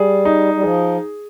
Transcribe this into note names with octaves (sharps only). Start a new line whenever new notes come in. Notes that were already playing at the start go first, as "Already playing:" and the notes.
Already playing: G3 G#4
D#4
G3
F3 G#4